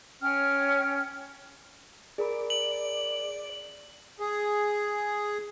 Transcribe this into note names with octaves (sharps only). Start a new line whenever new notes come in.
C#4 C#5 G5 F6
G#4 A#4 D5 B5
F#7
G#4